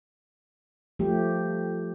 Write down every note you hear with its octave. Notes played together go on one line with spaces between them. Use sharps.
F3 A3 G4